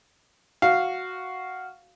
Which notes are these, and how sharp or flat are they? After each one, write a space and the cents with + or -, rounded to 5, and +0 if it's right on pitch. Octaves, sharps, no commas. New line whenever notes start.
F#4 +0 F5 +0